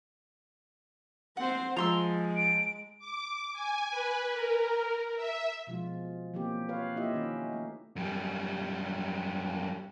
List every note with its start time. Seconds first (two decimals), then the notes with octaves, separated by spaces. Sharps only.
1.37 C4 C5 F#5
1.77 F3 G#3 A#5 C6 E6
2.37 D7
2.99 D6
3.53 G#5
3.90 B4
4.33 A#4
5.16 E5
5.67 B2 F3 G#3 F4
6.34 E3 F#3 A#3 C4 G4
6.69 F4 B4 C#5 F5
6.96 A#3 E4 F4 G4 D#5 E5
7.14 D#3 C#4 D#4 F4
7.53 A3
7.96 F#2 G3